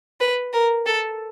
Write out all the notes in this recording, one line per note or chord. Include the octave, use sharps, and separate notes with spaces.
B4
A#4
A4